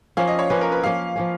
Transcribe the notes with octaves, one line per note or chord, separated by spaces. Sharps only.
F3 A#3 C#4 F5
D#5
C#5
F3 A#3 C#4 B4
A#4
B4
F3 A#3 C#4 F5
F3 A#3 C#4